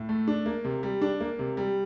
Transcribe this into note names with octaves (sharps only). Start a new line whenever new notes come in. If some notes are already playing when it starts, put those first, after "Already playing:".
Already playing: A2
A3
D4
A#3
C3
G3
D4
A#3
C3
G3